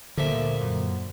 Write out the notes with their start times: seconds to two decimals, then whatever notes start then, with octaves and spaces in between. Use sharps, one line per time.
0.17 D2 A#2 D3 F3 G3 E5
0.61 F#2